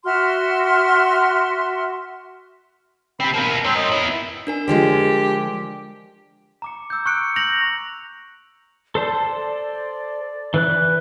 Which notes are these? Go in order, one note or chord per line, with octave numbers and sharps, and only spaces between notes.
F#4 E5 C6 F6
C4 G4 B5
B2 A#3 A#4
C4 A#4 C#5
D#5
B3 E4
D4 A#4 G#5
D3 F3 G#3 G4
A#5 D6 C#7
E6 G6
C#6 F#6 C#7 D7
G6 A#6 F7 F#7
A4 C5 D5 A5
E3 B4 F#6